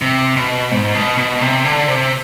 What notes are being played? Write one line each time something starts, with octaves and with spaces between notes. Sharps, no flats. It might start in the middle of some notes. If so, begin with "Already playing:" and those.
C3
B2
G#2
B2
B2
C3
D3
C3